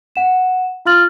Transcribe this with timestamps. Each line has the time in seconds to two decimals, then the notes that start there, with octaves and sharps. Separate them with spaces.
0.16 F#5 E7
0.86 F4 F5 C6 F6 A6 F#7